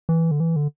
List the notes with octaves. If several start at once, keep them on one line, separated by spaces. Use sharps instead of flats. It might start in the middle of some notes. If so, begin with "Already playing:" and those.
E3
D3
E3
D3